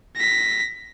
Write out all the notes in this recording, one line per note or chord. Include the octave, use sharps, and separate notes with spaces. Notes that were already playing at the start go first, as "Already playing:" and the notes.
A#6 B6